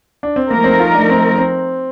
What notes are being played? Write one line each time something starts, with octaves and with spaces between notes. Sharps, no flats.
D4
C4
F3 A3 A#3 D#4 A#4
C4
F4
D4
C4
C4